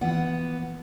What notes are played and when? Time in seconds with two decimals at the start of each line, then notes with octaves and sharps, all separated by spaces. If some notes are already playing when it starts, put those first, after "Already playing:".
0.01 E3 F3 B3 F#5